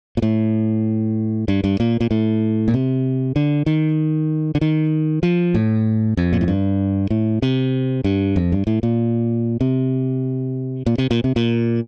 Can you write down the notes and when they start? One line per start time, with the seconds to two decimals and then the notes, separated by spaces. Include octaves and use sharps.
0.17 A#2
0.22 A2
1.48 G2
1.64 G2
1.80 A#2
2.01 A#2
2.11 A2
2.68 A#2
2.74 C3
3.36 D3
3.66 D#3
4.55 D3
4.61 D#3
5.23 F3
5.54 A2
6.17 F2
6.33 A#2
6.41 A2
6.48 G2
7.10 A2
7.42 C3
8.04 G2
8.36 F2
8.52 G2
8.67 A2
8.83 A#2
9.61 C3
10.86 A#2
10.98 C3
11.11 A#2
11.24 C3
11.36 A#2